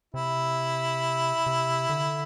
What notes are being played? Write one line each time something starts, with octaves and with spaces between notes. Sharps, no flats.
C3 E4
C3
D3